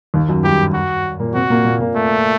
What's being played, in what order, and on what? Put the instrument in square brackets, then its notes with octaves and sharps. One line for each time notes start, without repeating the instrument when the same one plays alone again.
[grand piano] D#2 D#3
F#2 F#3
[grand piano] G2 G3 [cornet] G4
[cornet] F#4
[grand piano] A#2 A#3
[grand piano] C3 C4 [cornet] F#4
[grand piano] A#2 A#3
A#2 A#3
A#2 A#3
[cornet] A3